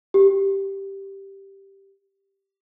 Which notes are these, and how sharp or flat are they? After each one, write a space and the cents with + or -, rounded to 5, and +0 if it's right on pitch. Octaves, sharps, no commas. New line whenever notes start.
G4 -5